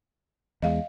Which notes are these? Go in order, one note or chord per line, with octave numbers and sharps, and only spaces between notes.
E2 G#3 D#5 F5